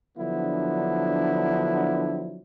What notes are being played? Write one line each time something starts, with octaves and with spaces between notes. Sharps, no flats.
D3 F3 F#3 B3 D4 E4